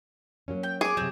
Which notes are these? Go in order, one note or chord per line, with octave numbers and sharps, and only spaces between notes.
F#3 A#3 C#4
G5
G#4 C#6 D6
C3 F#3 C4